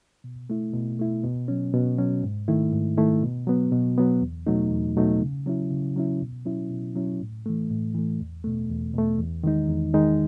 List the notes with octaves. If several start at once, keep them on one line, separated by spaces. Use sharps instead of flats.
B2
A3 E4
B2
A3 E4
B2
F#3 C#4
B2
F#3 C#4
G#2
D#3 A3 E4
G#2
D#3 A3 E4
B2
F#3 B3
B2
F#3 B3
E2
B2 F#3 A3 D#4
E2
B2 F#3 A3 D#4
C#3
F#3 C#4 E4
C#3
F#3 C#4 E4
B2
F#3 C#4 E4
B2
F#3 C#4 E4
A2
E3 A3
A2
E3 A3
E2
B2 A3
E2
B2 A3
E2
D#3 G#3 D#4
E2
D#3 G#3 D#4